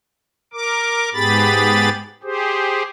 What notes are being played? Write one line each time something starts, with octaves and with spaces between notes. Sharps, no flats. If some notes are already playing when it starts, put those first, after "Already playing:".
A#4 D6
G#2 B3 G4 G#4 B5 A6
G4 G#4 C5